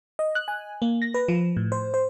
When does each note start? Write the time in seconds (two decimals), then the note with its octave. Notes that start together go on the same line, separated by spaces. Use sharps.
0.19 D#5
0.35 F#6
0.48 G#5
0.82 A#3
1.02 A#6
1.14 B4
1.28 F3
1.57 A2
1.72 C5
1.94 C5